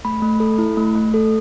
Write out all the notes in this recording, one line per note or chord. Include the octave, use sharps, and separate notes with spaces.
A3 B5
A3
A4
E4
A3
A3
A4